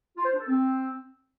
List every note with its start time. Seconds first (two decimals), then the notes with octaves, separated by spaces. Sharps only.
0.17 F4
0.25 C5
0.32 D4
0.40 A4
0.48 C4